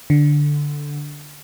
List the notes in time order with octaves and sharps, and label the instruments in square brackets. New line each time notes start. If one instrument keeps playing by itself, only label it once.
[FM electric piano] D3